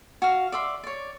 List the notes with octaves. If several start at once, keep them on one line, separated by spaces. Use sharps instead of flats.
F#4 F5
D5 E5 C6
C#5 D5